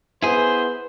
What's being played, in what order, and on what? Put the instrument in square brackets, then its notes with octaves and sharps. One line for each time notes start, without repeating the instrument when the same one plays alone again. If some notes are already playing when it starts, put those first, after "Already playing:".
[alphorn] B3 [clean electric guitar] E4 G#4 [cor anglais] C5